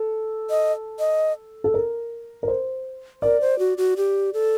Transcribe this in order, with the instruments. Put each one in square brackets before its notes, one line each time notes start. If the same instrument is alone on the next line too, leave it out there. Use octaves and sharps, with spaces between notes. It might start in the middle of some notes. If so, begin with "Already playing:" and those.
Already playing: [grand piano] A4
[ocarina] D#5
D#5
[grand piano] A4
A#4
A#4
C5
[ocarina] A#4 [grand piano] D5
[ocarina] C5
F#4
F#4
G4
A4